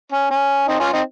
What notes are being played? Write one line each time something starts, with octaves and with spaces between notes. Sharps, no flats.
C#4
C#4
C4 D#4
C#4 F4
C4 D#4